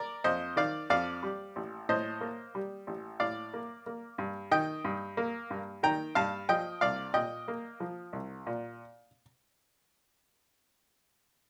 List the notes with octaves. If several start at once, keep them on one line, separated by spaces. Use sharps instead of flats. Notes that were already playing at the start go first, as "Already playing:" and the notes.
Already playing: A#4 D5
F2 C5 D#5
D#3 D5 F5
F2 D5 F5
G3
A1
A2 C5 D#5
A#3
G3
A1
A2 D5 F5
A#3
A#3
G2
D#3 D#5 G5
G2
A#3
G2
D#3 G5 A#5
G2 F5 A5
F3 D#5 G5
C2 D5 F5
A#2 D#5 G5
A#3
F3
C2
A#2